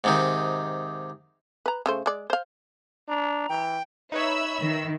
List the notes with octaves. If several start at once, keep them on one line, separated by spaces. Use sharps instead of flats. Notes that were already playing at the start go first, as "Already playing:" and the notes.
G#2 C3 D#3
B4 A#5
C#3 A3 C5
G#3 D5
C5 F5
D4 A#5
E3 G5
D#4 B4 C#5 E5 B5 E6
D#3